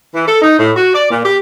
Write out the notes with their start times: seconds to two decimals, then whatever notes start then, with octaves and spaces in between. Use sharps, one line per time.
0.14 E3
0.27 A4
0.42 D#4
0.58 A2
0.76 F#4
0.94 D5
1.10 A#2
1.24 G4